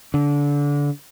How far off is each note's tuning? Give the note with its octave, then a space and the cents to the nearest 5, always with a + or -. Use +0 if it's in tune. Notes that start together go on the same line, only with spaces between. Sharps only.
D3 -25